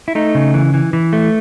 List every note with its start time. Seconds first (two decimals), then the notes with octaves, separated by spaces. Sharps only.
0.08 E4
0.15 A3 D#4
0.35 C#3
0.54 E3
0.74 E3
0.93 E3
1.13 A3